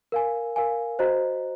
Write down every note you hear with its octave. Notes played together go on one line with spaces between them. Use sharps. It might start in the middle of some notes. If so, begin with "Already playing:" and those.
A#4 F5 G#5
A#4 F5 G#5
F#4 C5 D#5 A#5